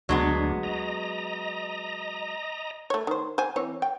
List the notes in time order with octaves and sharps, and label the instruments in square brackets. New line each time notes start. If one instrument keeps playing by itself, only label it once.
[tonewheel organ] D2 D4 [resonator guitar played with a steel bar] F#3 G#3 B3
[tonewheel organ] D#5 A#5
[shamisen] A3 C#5
D#3 C5
C5 G#5
E3 C4 C#5
G5